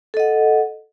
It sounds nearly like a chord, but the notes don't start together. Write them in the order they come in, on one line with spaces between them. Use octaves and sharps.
A4 D#5 F#5